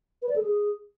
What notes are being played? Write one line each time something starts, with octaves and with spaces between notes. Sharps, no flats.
B4
D5
A4
G#4